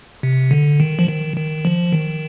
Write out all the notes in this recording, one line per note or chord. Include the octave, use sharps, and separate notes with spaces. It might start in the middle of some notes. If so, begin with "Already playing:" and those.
C3
D3
D#3
F3
D#3
D#3
F3
D#3